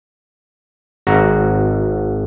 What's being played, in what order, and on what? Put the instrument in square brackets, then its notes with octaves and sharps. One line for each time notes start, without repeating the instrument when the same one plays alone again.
[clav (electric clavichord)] G#1 F#4 A#5